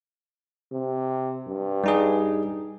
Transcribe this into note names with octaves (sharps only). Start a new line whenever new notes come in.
C3
G2
G3 D#4 G#4